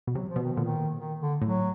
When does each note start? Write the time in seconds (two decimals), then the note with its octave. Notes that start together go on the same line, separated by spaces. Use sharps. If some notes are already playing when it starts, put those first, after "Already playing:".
0.07 B2
0.15 C3 F#3
0.29 F3
0.36 B2
0.43 D#3
0.54 A#2 D3
0.65 D#3
0.99 D#3
1.20 D3
1.41 A2 F#3